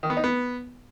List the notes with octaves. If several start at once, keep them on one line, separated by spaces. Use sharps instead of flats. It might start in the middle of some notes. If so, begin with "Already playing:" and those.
D#3
B3
D#4
B3